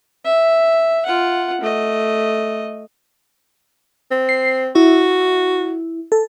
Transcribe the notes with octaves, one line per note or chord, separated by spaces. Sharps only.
E5
F4 F#5
A3 D#5
C4
C7
E4 F#4
A4